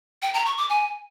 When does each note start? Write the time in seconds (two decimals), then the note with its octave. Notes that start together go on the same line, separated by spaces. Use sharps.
0.22 G5
0.34 A#5
0.46 C#6
0.58 D6
0.69 G#5